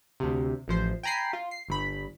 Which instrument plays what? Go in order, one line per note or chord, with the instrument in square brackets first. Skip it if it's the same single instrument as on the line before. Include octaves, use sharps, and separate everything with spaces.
[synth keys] D2 C3
A1 F3 C5
G5 G#5 A#5 B5 C7
F4
C7
G1 B5